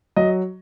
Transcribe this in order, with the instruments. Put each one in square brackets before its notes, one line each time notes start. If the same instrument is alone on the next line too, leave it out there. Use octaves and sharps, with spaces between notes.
[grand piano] F#3 D#5